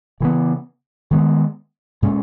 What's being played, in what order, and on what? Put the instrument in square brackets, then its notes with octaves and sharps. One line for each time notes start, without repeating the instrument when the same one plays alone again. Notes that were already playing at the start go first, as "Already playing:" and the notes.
[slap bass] C#3 E3 B3
D#3 G#3 B3
A#2 G#3 C#4